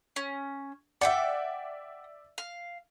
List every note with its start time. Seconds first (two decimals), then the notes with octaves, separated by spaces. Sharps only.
0.16 C#4
1.01 D5 E5 F#5 G5 D6
2.38 F5